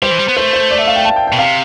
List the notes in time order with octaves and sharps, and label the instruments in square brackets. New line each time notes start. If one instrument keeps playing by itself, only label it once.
[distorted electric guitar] G3 [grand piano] C5
[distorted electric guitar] E3
G3
B3
[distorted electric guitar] A3 [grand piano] C5
[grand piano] C5
D5
E5
F5
G5
A5
G5
G5
[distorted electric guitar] B2
[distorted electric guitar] C3 [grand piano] F5